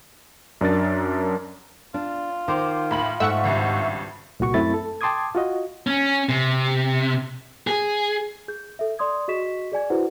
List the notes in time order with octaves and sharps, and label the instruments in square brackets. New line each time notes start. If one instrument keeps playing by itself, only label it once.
[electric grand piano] F#2 D4 A#4 A6
[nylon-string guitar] D4 [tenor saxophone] F4
[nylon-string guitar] D#3 [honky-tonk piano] C5 D6
[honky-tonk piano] A2 B5 F#7
[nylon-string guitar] G#2 [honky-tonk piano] A3 [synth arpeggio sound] E5 F#5 C#6
[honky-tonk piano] G#1 C#2 G2
[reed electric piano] C2 A#2 F#4 C#6
F#2 A3 C4 E4 B5 A6
A4
G5 A5 C6 D6 D#6 G#6
F4 F#4 D#5
[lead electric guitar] C#4
C3
G#4
[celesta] G#4 G6
A4 E5
D5 C6 D#6 G#6
F#4 G#4 D#5 C#6 B6 E7
G#4 D5 G#5 G#6
E4 F#4 G#4 B4 C5 F#5